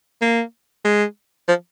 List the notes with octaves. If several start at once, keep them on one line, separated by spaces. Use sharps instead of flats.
A#3
G#3
F3